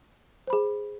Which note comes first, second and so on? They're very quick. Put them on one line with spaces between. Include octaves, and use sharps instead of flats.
C5 B5 G#4